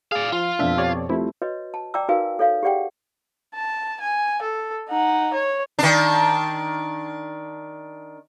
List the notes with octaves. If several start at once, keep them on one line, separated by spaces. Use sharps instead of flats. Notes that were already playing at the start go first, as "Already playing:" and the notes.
G#4 D5 F5
F3 F4
F2 B2 D4 E5
G4 C#5 D5
F3 G3 A3 C4 E4
F#4 B4 C#5 D#5
A5
D5 G5 A#5 D6 E6
D#4 F#4 A#4 B4 F5 G#5
A4 C#5 F5
G4 G#4 D5 F#5 G5
A5
G#5
A4
D#4 F#5
C#5
D#3 D4